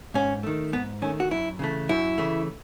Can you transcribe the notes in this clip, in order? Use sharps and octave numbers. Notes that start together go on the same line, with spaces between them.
G#2 C#4
D#3 A3
G#2 B3
D#3 A3 C#4
F#4
F#2 E4
C#3 E3 A3
F#2 E4
C#3 E3 A3